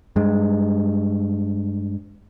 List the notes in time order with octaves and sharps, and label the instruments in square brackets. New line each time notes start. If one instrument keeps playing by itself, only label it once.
[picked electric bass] G2 G#3